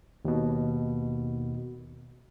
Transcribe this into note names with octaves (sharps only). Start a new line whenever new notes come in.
D#2 B2